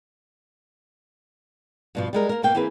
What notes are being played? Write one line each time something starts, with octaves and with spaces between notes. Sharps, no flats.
G2 B2 F3
G3 G#3 A#4
A#3 A#4
B2 A#3 G5
E3 A#3 C4 G#4 B4